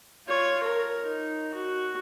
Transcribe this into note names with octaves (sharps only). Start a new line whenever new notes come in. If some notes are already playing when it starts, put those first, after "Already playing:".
F4 C#5
A#4
D#4
F#4